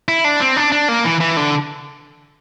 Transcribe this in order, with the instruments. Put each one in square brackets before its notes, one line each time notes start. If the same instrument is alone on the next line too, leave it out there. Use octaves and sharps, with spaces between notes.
[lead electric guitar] E4
D4
C4
D4
D4
A#3
E3
E3
D3